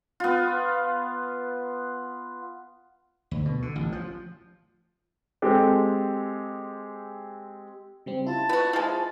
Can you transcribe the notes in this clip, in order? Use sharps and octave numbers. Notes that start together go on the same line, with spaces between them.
B3 F4
D2
B2
D3
A1
F3
G#3 C4 G4 A4
C#3 G3 C4
E4 F4 A5
B3 F#4
F3 G#3 E4 A6